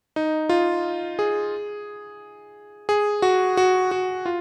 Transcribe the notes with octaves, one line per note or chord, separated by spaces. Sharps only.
D#4
F4
G#4
G#4
F#4
F#4
F#4
F4